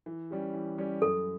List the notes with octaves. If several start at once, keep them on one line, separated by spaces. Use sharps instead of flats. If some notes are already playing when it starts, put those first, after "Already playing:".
E3
G3 C#4 G4
E3
G3 C#4 G4
F#2 A4